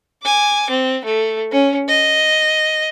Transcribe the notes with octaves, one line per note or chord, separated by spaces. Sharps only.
G#5 D6
C4
A3
C#4
D#5